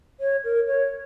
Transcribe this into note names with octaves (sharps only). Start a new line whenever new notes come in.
C#5
A#4
C#5